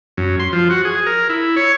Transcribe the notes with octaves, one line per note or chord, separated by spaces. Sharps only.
F#2
C6
F3
F#4
G#4
A#4
E4
C#5